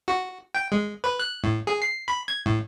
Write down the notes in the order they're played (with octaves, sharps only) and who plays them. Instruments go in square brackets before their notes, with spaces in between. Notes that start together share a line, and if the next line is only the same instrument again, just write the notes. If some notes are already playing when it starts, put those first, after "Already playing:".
[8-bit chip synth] F#4
G5
G#3
B4
F#6
A2
G#4
C7
B5
G#6
A2